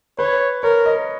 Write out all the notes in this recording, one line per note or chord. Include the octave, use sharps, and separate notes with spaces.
B4 C#5
A#4 C#5
D#5